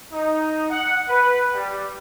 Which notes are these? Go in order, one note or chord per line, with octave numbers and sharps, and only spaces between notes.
D#4
F#5
B4
G3